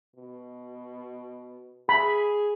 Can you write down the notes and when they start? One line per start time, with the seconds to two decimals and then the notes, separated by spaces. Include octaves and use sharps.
0.16 B2
1.89 G#4 B5